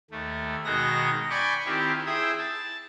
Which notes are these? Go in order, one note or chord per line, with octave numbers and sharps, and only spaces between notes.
D#2 A3
B2 D#3 G#3 D#4 F#4 A#6
D5 G5 G#5 B5 C#6 D6
D#3 C4 E4 F4 G4
E4 G#4 C5 E5 G5 D#6
A5